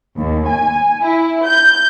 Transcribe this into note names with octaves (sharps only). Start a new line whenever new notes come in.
D#2
G#5
E4
G6